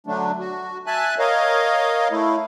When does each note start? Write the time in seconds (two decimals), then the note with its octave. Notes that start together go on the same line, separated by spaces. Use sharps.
0.07 D3 F#3 A3 D4
0.39 F#4
0.87 E5 G#5 A5 F#6
1.19 A#4 C#5 D#5 F5
2.12 A3 E4